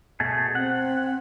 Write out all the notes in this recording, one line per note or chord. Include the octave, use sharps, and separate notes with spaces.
B2 A3 G#4
C4 F#5